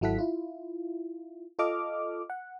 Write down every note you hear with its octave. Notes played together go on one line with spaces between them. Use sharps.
G#1 F#3 E4 A4 F#5 B6
E4 F4
F4 A4 D#5 D6 F6
F#5